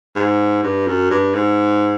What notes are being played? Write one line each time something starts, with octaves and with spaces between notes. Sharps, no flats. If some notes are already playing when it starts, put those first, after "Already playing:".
G#2
G2
F#2
G2
G#2